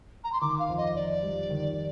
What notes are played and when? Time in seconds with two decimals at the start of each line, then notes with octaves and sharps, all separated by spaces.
0.24 A#5
0.33 C6
0.41 D#3 D6
0.59 F5
0.69 F2
0.77 D#5
0.95 F2 D5
1.22 G3
1.50 D#3